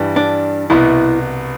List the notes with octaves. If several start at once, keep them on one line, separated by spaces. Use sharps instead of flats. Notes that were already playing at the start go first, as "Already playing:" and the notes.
Already playing: G2 E3 G3
D4
C2 B2 B3 E4